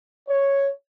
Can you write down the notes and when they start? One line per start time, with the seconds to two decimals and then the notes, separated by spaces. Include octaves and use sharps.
0.27 C#5